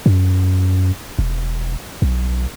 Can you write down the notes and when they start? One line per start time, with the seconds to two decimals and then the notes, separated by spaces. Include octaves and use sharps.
0.06 F#2
1.19 E1
2.02 B1